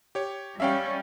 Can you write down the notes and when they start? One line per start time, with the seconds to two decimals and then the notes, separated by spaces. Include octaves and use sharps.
0.15 G4 C#5
0.60 G3 C#4 E5 F5 G5